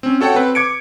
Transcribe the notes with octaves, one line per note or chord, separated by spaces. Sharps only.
C4 C#4
F#4 A4 C#5 F#5 G5
C4 B4
D6 G#6 C#7 D7